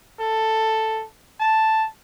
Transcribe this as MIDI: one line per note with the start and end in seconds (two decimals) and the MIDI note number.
0.19 1.04 69
1.40 1.86 81